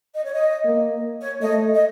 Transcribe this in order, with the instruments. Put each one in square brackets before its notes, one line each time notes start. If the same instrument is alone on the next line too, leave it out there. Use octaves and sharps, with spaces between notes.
[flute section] D#5
C#5
D#5
[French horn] A#3
[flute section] C#5
[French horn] A3 [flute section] D#5
[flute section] D#5